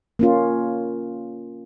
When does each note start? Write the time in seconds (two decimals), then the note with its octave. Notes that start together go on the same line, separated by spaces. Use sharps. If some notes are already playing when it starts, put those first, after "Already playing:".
0.19 A#3 C#4 F4